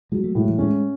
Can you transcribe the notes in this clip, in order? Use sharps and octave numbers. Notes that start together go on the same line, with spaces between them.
F#3 G#3
A3
A2 G#3
E3
G#3 C#4